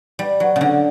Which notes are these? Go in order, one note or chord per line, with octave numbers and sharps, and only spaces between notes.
G3
F#3
C#3
D3